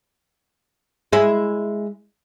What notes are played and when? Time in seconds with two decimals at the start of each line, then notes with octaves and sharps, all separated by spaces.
1.13 G#3 E4